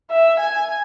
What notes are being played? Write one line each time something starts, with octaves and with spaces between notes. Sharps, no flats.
E5
G#5